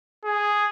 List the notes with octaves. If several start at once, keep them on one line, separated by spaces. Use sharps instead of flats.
G#4